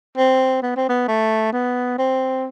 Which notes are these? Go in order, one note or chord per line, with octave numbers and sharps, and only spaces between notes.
C4
B3
C4
B3
A3
B3
C4